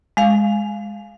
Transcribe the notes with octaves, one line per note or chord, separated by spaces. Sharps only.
G#3 F5